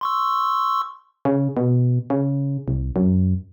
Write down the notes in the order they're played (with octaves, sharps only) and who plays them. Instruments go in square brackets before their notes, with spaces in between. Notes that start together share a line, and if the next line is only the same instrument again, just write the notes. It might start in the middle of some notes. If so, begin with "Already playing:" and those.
[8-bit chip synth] C6 C#6 E6
[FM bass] C#3
B2
C#3
C2
F#2